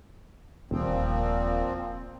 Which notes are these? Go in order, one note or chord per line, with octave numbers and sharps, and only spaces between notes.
D#1 A#2 F3 C4